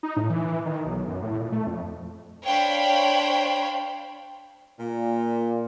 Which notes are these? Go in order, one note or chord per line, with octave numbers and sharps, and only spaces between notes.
D#4
A2
E3
D#3
B1
F#2
A2
A#2
A3
F2
D4 C5 C#5 F5 G5 B5
A#2